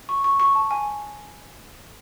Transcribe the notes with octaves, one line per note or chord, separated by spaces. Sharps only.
C#6
C#6
C#6
A5
G#5